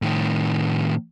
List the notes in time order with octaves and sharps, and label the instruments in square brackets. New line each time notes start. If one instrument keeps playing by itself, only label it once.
[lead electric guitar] A2 D#3